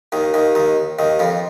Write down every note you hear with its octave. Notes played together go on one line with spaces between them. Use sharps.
D#2 D#3
D#2 D#3
D#2 D#3
D#2 D#3
F2 F3